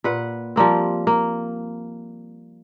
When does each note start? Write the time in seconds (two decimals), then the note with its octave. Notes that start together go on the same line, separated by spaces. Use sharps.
0.04 A#2 B4 F#5
0.56 F3 G3 A#3 C4
1.07 A#3